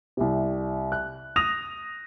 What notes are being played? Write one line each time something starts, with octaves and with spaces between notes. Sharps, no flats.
C2 C3
F#6
D#6 A#6 F7